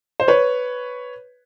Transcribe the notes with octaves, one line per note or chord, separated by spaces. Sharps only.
C5
B4 C#5